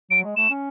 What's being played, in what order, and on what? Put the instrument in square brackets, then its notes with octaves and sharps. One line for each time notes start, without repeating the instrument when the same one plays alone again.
[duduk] F#3 [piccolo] D7
[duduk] G#3
[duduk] A3 [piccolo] E7
[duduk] C#4